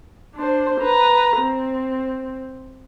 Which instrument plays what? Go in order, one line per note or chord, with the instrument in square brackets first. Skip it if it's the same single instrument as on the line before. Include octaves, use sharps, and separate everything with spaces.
[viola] D4 C5
B4 A#5
C4